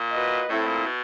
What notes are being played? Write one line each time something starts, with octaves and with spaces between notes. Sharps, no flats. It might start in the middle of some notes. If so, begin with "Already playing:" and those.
Already playing: A#2
F#4 B4 D#5
A2 A3 C4 E4 A4
A#2
B2